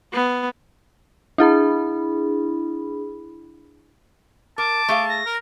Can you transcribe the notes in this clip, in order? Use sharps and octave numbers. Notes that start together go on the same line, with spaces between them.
B3
D4 E4 G#4 B5
A#4 A5 D6
A3 G#4 F5
A#6
A#4